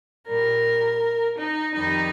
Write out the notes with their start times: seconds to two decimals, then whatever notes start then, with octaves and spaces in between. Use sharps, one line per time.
0.27 A#2 G3 A#4
1.38 D#4
1.74 F2 D#3 G3 D#4